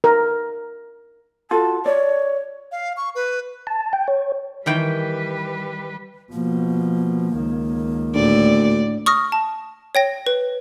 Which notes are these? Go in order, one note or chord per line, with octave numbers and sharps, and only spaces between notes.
A#4
F4 F#4 A4 A5
C#5 D5
F5
C#6
B4
A5
G5
C#5
D#3 E3 G3 B4 G5
B2 F3 A#3
C#2 D#3
D2 A2 D5
C#6 D#6 F6 A#6
A5
C#5 G5 A#6
B4